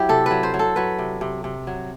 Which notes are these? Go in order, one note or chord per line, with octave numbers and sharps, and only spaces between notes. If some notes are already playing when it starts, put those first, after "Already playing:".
Already playing: F#3 E4 G4
C3 A4
F#3 B4
C5
F#3
A4
F#3 B4
C3
C3
C3
F#3